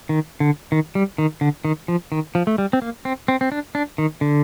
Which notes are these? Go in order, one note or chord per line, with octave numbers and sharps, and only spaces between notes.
D#3
D3
D#3
G3
D#3
D3
D#3
F3
D#3
F3
A3
G3
C4
A#3
C4
C4
C4
D4
D4
D#3
D3